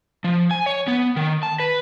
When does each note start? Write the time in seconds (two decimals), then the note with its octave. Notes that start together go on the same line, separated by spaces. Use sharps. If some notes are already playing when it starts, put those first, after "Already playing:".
0.24 F3
0.51 G#5
0.66 C#5
0.87 B3
1.16 D#3
1.43 A5
1.60 B4